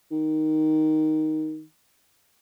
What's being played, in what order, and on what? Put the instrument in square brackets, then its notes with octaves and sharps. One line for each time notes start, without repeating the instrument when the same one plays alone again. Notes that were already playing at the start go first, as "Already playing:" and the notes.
[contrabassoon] D#3